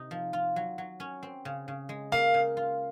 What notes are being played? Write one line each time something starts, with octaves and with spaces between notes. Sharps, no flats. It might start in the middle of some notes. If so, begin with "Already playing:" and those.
Already playing: C3 D#4
F3
F4
F#3
F#3
C#4
C4
C#3
C#3
G#3
A#3 F5
C#3
F4